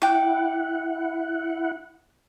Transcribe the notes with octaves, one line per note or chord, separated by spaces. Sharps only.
E4 F#5 G5 D6